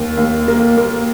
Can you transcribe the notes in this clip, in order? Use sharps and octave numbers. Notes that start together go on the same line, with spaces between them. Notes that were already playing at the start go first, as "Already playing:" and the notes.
Already playing: D#2
D#2
A#3
A#3